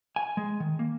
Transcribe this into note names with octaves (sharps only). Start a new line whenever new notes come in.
G#5
G#3
D#3
A#3